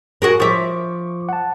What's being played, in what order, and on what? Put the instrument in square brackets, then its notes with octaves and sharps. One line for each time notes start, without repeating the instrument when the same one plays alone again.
[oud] F#4 G#4 A#4
[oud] F3 E5 [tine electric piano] C#6 D6
[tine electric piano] F#5 A5